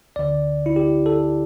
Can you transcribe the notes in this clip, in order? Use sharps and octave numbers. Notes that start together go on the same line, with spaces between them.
D2 D3 D5
E4
G4
A4